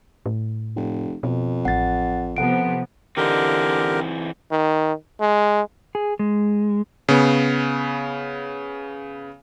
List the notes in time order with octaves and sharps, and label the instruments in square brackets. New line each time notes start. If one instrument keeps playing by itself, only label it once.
[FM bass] A2
[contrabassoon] F1
[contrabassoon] F2 [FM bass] B2
[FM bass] A1 [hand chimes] F#5 A6
[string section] C3 F3 B3 [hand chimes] A4 F#5 D7
[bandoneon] D3 G4 A#4 [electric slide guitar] E3 C4 D#4
[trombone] D#3
G#3
[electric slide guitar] G#4
G#3
[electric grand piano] C#3 B3